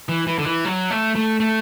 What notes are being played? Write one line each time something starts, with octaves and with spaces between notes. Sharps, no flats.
E3
E3
D3
E3
F#3
A3
A3
A3